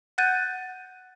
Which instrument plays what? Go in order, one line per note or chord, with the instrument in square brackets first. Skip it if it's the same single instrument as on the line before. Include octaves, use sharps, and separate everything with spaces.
[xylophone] F#5 F#6 G6 A6 D#7